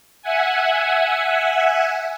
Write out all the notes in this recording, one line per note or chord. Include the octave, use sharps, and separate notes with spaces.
E5 F#5 G#5